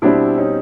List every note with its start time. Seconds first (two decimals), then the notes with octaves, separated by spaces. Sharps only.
0.02 B2 G3 C4 D4 E4
0.37 C#4 D#4